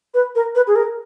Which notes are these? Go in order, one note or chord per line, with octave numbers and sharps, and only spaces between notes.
B4
A#4
B4
G#4
A#4